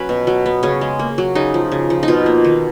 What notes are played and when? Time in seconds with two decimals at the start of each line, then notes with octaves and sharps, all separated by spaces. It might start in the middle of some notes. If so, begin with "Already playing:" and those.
Already playing: F#3 C#4 B4
0.09 B2
0.27 F#3
0.46 B3
0.63 C#3 C#4
0.81 G#3
0.99 A#3
1.18 F#3
1.35 C#3 D#4
1.54 F3
1.72 C#3
1.90 F3
2.03 D#4
2.08 B2 F4
2.26 A#3
2.45 D#3